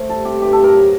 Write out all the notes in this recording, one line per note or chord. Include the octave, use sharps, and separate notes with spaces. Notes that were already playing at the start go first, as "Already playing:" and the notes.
Already playing: A3 C5
G3 A4
C3 G4
G2 G4
A4
G2
A#4
F#3